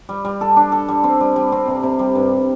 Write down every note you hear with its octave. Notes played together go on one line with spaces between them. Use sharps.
G3
G3
A4
D4
A4
G3
C4
G3
G3
C4
C3
C3
G3
G2